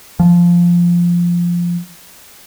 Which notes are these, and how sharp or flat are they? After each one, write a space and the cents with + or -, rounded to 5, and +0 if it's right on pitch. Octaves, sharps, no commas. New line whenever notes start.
F3 -5